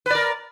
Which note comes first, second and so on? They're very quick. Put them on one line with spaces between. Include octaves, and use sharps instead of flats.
B4 D5 A#4